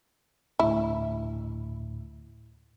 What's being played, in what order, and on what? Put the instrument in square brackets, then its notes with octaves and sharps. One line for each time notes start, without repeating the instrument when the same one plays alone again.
[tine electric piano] D2 A2 [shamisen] E4